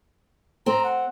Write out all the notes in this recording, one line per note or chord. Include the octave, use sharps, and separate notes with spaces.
C4 A#5
F#5